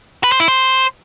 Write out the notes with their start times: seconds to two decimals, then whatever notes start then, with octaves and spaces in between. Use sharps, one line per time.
0.24 B4
0.32 C5
0.40 E4
0.48 C5